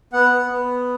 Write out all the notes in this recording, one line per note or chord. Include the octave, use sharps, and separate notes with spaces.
B3 F#5
B3
B3